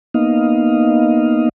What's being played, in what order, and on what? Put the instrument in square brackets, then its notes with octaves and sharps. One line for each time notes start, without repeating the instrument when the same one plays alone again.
[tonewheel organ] A#3 B3 D#4 D#5 F5